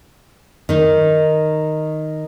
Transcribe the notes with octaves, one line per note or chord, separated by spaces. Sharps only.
D#3 D#4